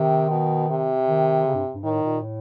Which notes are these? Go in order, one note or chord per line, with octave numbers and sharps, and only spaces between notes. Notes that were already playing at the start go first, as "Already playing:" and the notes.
Already playing: C3 D#3
B2
C3
D#3
C#3
G2
G2
A2 D#3
A#2
A2